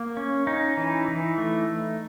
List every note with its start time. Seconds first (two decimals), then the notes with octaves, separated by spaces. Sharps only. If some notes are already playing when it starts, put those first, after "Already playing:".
Already playing: A#3
0.17 C#4
0.47 C#4 D#4
0.77 E3
1.08 E3
1.38 A3